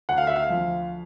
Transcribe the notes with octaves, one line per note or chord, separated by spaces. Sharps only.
D2 F#5
F5
E5
F5
F3